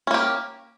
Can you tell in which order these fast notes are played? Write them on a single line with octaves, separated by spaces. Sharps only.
C#4 A#3 G4